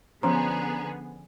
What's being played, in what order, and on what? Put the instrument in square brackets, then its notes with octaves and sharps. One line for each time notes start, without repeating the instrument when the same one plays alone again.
[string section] D3 B3 G#4 [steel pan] F3 C#4 C5 [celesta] A#5